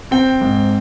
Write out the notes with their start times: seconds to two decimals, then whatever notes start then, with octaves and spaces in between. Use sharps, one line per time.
0.11 C4 G5
0.41 G#2